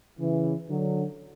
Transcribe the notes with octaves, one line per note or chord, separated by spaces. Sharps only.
C#3 E3
D3 F#3